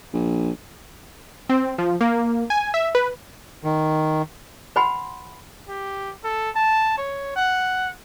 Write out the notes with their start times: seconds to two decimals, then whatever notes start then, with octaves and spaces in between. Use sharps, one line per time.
0.13 A#1
1.49 C4
1.78 F3
2.01 A#3
2.50 G#5
2.74 E5
2.95 B4
3.64 D#3
4.76 B4 F#5 G#5 B5 C6
5.68 G4
6.24 A4
6.55 A5
6.98 C#5
7.36 F#5